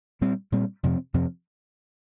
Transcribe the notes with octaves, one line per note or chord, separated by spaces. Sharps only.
A#2 G3 C4
A#2 G3 C4
F2 C3 F3 C4
F2 C3 F3 C4